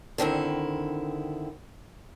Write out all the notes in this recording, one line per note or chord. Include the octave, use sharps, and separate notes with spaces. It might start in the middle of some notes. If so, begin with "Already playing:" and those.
D3 D#3 C4 E4